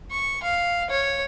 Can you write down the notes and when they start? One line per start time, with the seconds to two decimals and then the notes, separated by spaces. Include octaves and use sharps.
0.11 C#6
0.43 F5
0.90 C#5